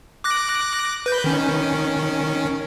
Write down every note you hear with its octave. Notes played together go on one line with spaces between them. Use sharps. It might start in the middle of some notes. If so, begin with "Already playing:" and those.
D6 F#6 A#6
B4 G6
D#3 C#4